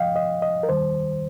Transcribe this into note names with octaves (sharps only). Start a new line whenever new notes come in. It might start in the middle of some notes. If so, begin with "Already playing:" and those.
Already playing: F2 F3 D#5 F5 G5
D#5
D#5
A#4
D#2 D#3 G3 C5